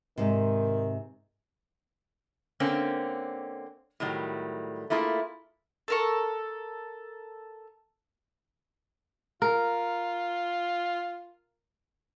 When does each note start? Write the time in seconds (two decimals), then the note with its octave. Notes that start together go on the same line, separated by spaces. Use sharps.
0.18 G#2 C3 D#3
2.60 D3 A#3 C4 C#4
4.00 A2 D#3 F#3 G3
4.90 A3 A#3 E4 F4 G#4
5.88 A4 A#4 C#6
9.42 F4 A#4